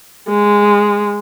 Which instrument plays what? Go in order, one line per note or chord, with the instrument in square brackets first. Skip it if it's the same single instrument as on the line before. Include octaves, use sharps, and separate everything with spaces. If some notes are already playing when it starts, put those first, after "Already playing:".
[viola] G#3